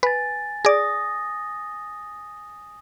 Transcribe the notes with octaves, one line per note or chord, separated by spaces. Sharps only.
B4 G#5 A6
G#4 D5 D#6 A#6